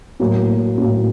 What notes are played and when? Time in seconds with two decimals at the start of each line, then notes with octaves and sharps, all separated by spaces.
0.20 A2 F#3 A#3
0.78 A2 F#3 A#3